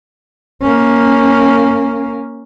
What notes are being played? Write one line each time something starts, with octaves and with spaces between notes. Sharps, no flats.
A#3 C#4